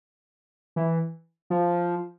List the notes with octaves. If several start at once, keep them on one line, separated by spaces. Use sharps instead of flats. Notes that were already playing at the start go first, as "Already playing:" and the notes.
E3
F3